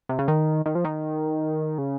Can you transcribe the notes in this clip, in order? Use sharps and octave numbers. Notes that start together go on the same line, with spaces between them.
C3
C#3
D#3
D#3
F3
D#3
C#3